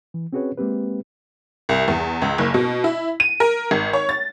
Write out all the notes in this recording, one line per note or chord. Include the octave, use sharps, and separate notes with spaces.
E3
C4 C#4 F#4 G#4 B4 C#5
G#3 A#3 C4 G4 B4
C2
E2
C#2
F#1
B2
E4
D#7
A#4
G#1
C#5
A6